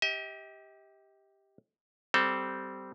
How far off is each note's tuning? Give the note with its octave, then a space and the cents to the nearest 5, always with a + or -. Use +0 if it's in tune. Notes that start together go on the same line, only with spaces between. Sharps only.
G4 +0 D#5 +45
G3 -15 C4 -10 A4 +0